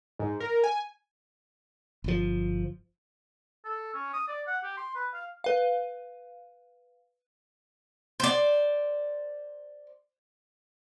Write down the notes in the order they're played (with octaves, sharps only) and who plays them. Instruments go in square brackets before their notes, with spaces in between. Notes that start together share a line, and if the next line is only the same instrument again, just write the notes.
[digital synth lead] G#2
A#4
G#5
[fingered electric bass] G1 F3
[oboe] A4
C#4
D#6
D5
F#5
G4
C6
B4
F5
[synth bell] B4 F5
[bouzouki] C5 D5